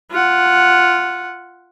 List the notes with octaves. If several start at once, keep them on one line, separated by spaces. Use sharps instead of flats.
F4 F#5